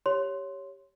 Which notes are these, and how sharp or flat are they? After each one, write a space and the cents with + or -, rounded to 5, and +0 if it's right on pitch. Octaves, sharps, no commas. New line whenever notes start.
G4 +0 C#5 +0 C6 +0